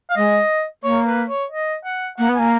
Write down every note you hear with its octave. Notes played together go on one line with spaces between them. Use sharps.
F5
G#3 D#5
A#3 C#5
B4
C#5
D#5
F#5
A#3 F#5
B3
A#3 G#5